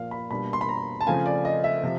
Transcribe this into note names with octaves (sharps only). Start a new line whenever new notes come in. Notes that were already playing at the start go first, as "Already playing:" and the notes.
Already playing: A#2 F3 A#3 F5
B5
B2 G3 A#3 D4 B5
C6
B5
A#5
A5
C#3 F3 A3 C4 F4 G#5
D5
D#5
E5
C3 F3